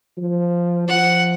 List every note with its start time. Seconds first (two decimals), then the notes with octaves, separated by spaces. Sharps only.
0.18 F3
0.88 F3 F#5